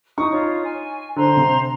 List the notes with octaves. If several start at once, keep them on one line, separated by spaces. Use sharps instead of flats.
D#4 E4 C#6 D#6
F4 C#5
G#5
D3 C5 A#5 C6
C3